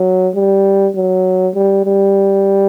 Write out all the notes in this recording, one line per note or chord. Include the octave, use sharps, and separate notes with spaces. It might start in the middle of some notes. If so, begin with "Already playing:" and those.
Already playing: F#3
G3
F#3
G3
G3